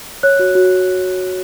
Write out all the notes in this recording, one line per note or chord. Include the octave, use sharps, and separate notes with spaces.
C#5 F#6
F#4
F#4